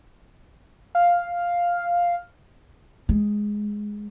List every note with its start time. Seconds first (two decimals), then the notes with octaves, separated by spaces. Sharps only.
0.95 F5
3.09 G#3